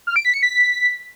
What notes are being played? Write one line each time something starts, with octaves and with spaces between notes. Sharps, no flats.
F6
D7
B6
C#7
B6